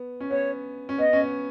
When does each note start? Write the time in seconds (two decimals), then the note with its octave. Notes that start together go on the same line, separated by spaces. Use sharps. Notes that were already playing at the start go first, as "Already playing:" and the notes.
Already playing: B3
0.20 C#4
0.30 B3 C#5
0.89 C#4
0.98 B3 D#5
1.13 C#4
1.22 B3